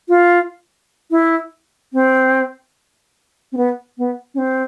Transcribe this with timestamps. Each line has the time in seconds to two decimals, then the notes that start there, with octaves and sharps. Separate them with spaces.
0.09 F4
1.11 E4
1.93 C4
3.52 C4
3.57 B3
3.98 B3
4.34 C#4
4.38 C4